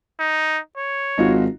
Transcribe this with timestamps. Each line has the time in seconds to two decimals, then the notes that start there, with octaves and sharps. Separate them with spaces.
0.20 D#4
0.77 C#5
1.18 G#1 D#4 F4 F#4